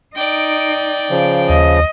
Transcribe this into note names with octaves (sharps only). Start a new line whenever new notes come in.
D#4 D5 G5
C#3 F3
D#2 D#5